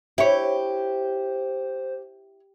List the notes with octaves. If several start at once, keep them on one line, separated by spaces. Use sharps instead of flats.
E4 G4 C5 C#5